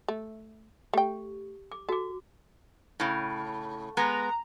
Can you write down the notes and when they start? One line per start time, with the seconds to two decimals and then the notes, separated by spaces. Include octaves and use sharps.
0.08 A3
0.94 A3 G4 G5
1.72 D6
1.89 F#4 A4 D6
3.00 A2 C#3
3.97 G#3 B3 A#5